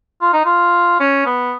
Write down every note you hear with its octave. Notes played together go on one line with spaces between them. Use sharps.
F4
D#4
F4
C#4
B3